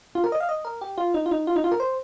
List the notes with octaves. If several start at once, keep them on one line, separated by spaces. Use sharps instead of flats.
F4
A#4
D#5
F5
D#5
A#4
G4
F4
D#4
F4
D#4
F4
D#4
F4
A#4
C5